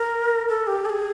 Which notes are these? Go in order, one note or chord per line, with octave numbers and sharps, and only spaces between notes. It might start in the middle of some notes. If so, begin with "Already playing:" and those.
Already playing: A#4
A4
G4
A4
G#4